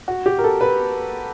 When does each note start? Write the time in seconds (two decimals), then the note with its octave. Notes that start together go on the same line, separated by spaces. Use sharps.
0.08 F#4
0.26 G4
0.38 A#4
0.44 A4
0.61 B4